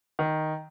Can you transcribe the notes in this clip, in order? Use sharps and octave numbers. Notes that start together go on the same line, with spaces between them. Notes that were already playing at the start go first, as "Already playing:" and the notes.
D#3